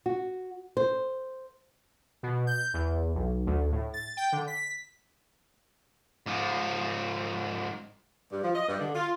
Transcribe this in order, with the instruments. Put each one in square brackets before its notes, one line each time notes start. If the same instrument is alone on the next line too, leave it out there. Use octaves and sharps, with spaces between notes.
[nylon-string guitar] F#4
C5
[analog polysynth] B2
G6
E2
B1
D2
A2
A6
G5
D3
B6
[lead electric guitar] G#2 F3
[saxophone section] G2
F3
D#5
G2
D3
F4